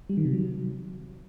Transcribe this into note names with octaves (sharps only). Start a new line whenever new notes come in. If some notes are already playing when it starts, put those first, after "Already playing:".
G3
D#3
C3
F#3